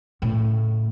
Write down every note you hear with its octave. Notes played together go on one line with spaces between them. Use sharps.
A2 C#3